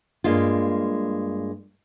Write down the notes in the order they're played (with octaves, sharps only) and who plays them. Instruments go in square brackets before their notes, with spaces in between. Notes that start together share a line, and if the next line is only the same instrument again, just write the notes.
[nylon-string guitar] G2 G#3 A#3 F4